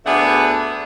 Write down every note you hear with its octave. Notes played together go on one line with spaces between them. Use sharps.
D2 B3 D4 G#4 E5 F#5